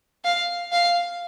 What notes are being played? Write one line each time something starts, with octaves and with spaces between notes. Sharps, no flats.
F5
F5